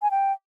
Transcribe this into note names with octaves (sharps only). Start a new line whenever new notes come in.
G#5
G5